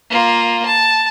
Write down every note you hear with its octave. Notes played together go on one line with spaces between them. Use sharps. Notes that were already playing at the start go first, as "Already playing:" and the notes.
A#3 F4
A5